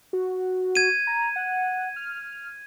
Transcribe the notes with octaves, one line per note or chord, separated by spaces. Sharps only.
F#4
G#6 D#7
A#5
F#5
F6